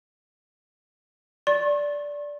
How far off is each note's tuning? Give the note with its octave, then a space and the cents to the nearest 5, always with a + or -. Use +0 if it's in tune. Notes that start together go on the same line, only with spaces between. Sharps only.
D5 -10 C#6 -45